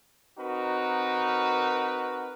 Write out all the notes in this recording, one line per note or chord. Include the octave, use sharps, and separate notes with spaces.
C4 D#4 F#4 A#4 B4